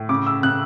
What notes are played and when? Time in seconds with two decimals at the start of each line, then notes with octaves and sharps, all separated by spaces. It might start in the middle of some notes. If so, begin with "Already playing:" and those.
Already playing: A2
0.09 C#3 D6
0.26 E6
0.43 C#3 F#6